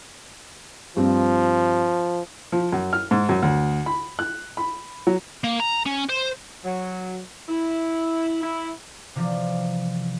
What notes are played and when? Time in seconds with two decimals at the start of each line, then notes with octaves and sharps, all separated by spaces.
0.97 G2 F3 C4
2.52 F3
2.73 F#2
2.93 F6
3.11 G#2
3.29 F#2
3.43 D2
3.86 B5
4.19 F#6
4.57 B5
5.07 F#3
5.44 A#3
5.60 A#5
5.86 C#4
6.09 C5
6.65 F#3
7.49 E4
8.43 E4
9.15 C3 E3 F3 G3